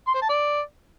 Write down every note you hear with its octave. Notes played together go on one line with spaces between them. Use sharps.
C6
C5
A5
D5